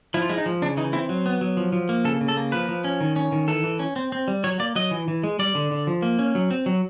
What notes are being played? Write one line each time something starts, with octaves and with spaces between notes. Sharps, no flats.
F3 E4
F4
G#3 E4
D#4
F3
C#3 D4
E3 D#4
C4 E4
F#3
B3
F#3
F3
F3
A#3
C#3 A4
C#3
A4
A#3
F3 B4
F3
C#4
D#3
C#4
D#3
E3 A4
E3
C#4
C4
C4
G3
F#3 C#5
A#3 D5
F#3 D#5
E3
E3
G#3
G3 D5
D3
D3
F3
A#3
C#4
F#3
C4
F#3